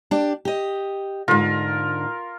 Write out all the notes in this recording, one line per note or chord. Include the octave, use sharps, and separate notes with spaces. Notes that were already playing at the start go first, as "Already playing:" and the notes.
D4 G4
G4 D#5
G#2 D3 F4 A#4